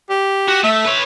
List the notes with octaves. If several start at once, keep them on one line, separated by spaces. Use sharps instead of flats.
G4
F#4
A3 E5
B4 C#5